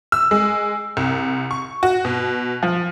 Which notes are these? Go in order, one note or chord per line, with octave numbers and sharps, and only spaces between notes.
E6
G#3
C2
C#6
F#4
B2
F3